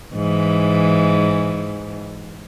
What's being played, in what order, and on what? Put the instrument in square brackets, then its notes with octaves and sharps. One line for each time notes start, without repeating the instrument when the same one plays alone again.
[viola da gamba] G#2 E3